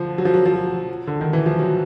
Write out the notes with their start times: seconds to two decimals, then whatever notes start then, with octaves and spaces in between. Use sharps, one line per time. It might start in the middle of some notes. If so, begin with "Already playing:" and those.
Already playing: D3 F3
0.18 F#3
0.25 F3
0.34 F#3
0.46 F3
0.54 F#3
1.07 D3
1.21 D#3
1.33 E3
1.46 F3
1.59 F#3